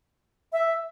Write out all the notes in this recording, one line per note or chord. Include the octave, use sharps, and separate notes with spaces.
E5